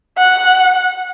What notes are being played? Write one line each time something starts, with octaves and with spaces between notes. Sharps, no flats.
F#5